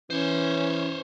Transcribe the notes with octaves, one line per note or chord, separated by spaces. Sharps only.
E3 C#4 C5 C#5